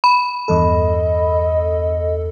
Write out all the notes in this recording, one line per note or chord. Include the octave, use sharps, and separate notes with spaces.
B5
E2 G2 A4 D#5